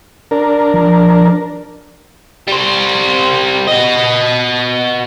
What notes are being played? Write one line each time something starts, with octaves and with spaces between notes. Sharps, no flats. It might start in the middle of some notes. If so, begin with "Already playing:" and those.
D4 A#4
F3
G3 C5
F#4 D#5